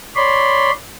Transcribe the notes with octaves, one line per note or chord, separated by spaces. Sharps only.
C#5 D5 B5 C6